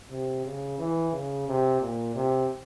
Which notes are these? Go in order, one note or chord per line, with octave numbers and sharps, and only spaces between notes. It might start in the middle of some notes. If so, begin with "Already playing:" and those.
C3
C#3
E3
C#3
C3
A#2
C3